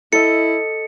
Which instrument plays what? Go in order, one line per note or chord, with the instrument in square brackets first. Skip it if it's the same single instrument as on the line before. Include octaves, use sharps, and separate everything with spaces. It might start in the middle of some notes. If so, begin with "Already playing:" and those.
[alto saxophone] E4 [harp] A4 D#5 [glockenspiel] C#7